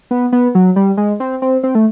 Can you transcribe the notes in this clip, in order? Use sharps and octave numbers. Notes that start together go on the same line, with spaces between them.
B3
B3
F#3
G3
G#3
C4
C4
C4
A3